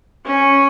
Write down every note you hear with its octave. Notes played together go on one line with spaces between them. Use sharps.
C#4